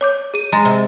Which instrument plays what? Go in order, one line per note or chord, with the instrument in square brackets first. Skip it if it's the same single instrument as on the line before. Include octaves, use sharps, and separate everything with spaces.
[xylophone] C#5 D6 G6
G#4 D#7
[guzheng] G#3 [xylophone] A#5 A6 A#6
[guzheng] C3